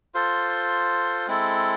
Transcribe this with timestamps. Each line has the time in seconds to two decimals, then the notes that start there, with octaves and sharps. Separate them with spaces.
0.14 F4 A4 C5
1.27 G#3 C4 E4 A4